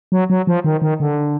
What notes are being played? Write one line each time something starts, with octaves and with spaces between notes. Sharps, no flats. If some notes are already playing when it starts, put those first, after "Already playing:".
F#3
F#3
F3
D#3
D#3
D3